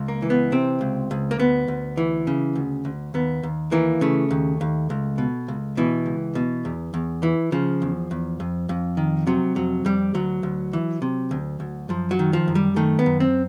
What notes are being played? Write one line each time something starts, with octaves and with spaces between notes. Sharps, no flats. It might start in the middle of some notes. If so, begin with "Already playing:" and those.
Already playing: C#2
A#3
E3
B3
C3 C4
C#2
C#2
A#3
D2 B3
D2
E3
C#3
D2
D2
D#2 B3
D#2
E3 A#3
C#3 A3
D#2
D#2
C#2
B2
C#2
B2 E3
C#2
B2
E2
E2
E3
C#3 F3
E2
E2
F2
F2
D#3
C3 F#3
F2 F#3
F2 G3
D2 F#3
D2
E3
C3
D2
D2
F#2 F3
F#3
D#3
F3
F#2
G3
D#3 A3
B3
F#2
C4